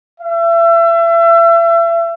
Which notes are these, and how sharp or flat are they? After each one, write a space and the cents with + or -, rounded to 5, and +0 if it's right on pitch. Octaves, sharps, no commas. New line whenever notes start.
E5 +35